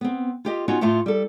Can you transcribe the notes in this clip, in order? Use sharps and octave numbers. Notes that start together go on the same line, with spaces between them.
B3 C4
F4 G4 D#5
B3 C#4 D#4 F4 F#4
A2 A3 F4
G3 A4